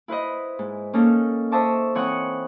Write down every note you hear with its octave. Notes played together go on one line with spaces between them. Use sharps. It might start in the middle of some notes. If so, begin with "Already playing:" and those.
E4 B4 C5 D#5
G#2
A#3 C#4 D#4 A4
C5 D#5 E5 A5 C#6 D6
E3 C4 C#5 F#5 C#6 D#6